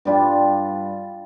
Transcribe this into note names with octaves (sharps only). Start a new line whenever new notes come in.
G2 G3 D4 F4